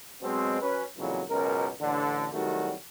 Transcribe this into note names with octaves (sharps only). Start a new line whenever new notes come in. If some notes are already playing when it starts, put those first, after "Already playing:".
B2 F#3 G#3 C4
F#3 C#4 B4
B1 F2 A#2 C#3 E3 F#3
C#2 F#2 B2 A#4
A1 D3
C2 D#3 F#3 G3 A3 F#4